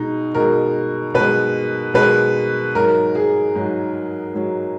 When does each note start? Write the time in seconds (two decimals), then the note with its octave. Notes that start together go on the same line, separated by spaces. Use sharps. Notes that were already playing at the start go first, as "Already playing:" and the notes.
Already playing: B2 G#3 D#4
0.35 B2 G#3 A#4
1.14 B2 G#3 B4
1.94 B2 G#3 B4
2.75 G#2 F#3 A#4
3.15 G#4
3.55 G#2 F#3
4.34 G#2 F#3